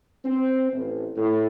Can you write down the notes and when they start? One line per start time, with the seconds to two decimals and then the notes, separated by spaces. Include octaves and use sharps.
0.25 C4
0.72 A1
1.17 A2